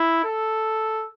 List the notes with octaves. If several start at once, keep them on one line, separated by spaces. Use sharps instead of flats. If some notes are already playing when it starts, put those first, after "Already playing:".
Already playing: E4
A4